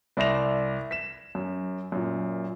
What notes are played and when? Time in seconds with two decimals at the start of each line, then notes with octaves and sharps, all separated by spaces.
0.17 C2 D5 E5 C6 A#6 F7
0.91 B6 E7
1.35 F#2
1.92 F#2 A#2